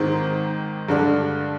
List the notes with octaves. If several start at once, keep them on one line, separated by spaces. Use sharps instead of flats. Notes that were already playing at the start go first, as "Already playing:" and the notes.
Already playing: G#2 D#3 G#3 C4
G2 D3 G#3 D4